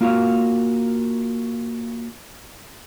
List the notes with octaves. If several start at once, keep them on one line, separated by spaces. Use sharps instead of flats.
A#3 F4 F#4 A#4 F5